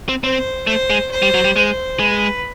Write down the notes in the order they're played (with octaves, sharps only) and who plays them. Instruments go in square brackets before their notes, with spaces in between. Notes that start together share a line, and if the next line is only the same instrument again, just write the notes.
[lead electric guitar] C4
[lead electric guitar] C4 [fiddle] C5
[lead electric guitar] A3 [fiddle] C5
[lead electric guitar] G#3
[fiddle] C5
[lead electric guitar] G3
F#3
G3
[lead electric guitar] G#3 [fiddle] C5
[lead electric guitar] G#3 [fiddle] B4